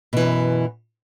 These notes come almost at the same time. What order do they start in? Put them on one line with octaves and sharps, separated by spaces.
B2 E3 F#2